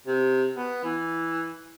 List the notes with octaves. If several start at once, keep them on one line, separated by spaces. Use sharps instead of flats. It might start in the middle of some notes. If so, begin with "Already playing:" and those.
C3
B3
E3